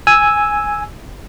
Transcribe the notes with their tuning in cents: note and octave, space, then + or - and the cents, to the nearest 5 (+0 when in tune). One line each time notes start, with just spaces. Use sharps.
G#5 +0 E6 -5